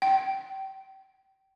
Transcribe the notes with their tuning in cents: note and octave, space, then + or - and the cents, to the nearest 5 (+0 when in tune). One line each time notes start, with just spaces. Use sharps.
G5 -30